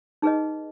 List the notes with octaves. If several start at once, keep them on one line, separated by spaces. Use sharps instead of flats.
D#4 G#4 B4 D#5